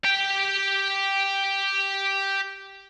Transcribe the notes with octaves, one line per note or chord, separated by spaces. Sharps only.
G4 G5